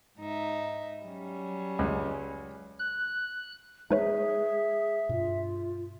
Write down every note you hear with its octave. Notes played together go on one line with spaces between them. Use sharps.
G#2 D#4 E5
F#3 G3 C#4
C#2
F#6
G#3 D#4 G#4 B4 C#5 E5
G2 B2 F4